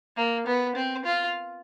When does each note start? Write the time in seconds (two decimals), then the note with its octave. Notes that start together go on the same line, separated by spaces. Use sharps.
0.17 A#3
0.46 B3
0.75 C4
1.05 F4